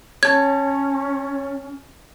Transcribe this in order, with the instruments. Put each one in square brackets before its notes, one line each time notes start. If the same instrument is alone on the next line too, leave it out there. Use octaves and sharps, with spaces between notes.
[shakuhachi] C#4 [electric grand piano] C#5 A5 [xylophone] G#6